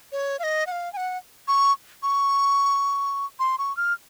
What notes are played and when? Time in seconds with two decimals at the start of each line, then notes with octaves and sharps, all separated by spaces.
0.12 C#5
0.39 F5
0.43 D#5
0.67 F#5
0.72 F5
0.93 G#5
0.97 F#5
1.48 C#6
2.03 C#6
3.39 C6
3.59 C#6
3.77 F6